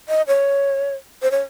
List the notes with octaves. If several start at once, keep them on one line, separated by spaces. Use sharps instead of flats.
D#5
C#5
C5
C#5